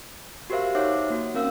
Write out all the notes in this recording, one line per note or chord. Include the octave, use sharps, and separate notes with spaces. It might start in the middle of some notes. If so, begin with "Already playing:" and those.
F#4 G4 A#4 C5 E5 F5
D#4 C5 C#5 E5 F#5 D6
A#3 F#4
C4 C#4 A#4 F5 E6